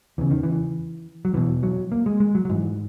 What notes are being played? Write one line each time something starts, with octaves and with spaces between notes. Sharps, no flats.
E2 C#3 E3
D#3
E3
F#3
E2 B2 E3
F#3
A#3
G#3
G#3
F#3
F#3
G#2 E3